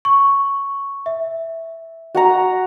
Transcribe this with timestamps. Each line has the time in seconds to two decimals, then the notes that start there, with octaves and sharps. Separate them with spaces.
0.05 C#6
1.06 E5
2.15 F#4 F#5 A#5